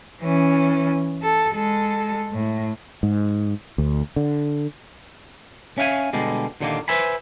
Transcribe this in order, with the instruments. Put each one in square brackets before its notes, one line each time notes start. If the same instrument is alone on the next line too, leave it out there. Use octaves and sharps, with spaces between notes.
[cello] E3 C#4
A4
G#3 A4
A2
[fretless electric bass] G#2
D2
D3
[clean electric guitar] C#4 E5 F5 G5 G#5
B2 D3 G3 G#3
D#2 A#2 D3 D#3 G3 A#3
B4 C5 E5 G#5 B5